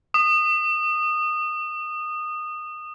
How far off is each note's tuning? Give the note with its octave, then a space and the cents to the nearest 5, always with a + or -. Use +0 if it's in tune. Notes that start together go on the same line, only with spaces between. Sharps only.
D#6 -20